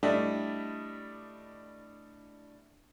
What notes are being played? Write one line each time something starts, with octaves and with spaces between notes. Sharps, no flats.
G3 A3 D4 E4 D5 D#5